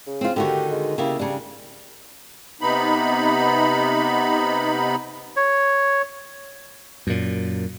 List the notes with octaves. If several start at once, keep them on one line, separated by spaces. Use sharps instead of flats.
C#3
C4 F4
D3 D#3 F#4 G4
G#3
C#3 A#3 E4 G4
C#3 G3 D4
C3 B3 D#4 B5
C#5
F#2 A#2